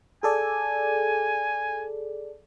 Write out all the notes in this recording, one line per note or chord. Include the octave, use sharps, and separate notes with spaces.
G#4 A4 D5 G#5